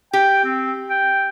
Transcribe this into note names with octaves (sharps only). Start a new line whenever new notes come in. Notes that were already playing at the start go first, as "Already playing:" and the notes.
G4 G5
C4
G5